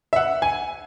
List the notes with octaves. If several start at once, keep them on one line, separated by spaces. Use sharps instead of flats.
E5
F#5
G#5